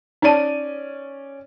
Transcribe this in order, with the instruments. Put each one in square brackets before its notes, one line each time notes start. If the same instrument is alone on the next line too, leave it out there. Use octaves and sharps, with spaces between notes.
[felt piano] C#4 D5 D#7 [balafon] D#4 A5